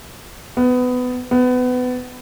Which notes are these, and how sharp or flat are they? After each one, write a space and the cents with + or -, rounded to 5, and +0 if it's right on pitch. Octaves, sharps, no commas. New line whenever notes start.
B3 +20
B3 +25